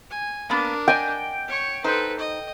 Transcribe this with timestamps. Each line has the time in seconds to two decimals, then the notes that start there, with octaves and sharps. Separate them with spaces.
0.11 G#5
0.50 A#3 B3 D4 A#4
0.88 D5 D#5 G5 G#5
1.47 C#5 C#6
1.84 D#4 A4 B4 C5
2.19 D#5